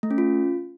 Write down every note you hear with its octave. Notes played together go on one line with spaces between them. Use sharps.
A3
C#4
F4